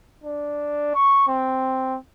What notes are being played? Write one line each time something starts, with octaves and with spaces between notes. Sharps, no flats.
D4
C#6
C4